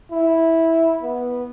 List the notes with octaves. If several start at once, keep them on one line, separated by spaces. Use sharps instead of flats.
E4
B3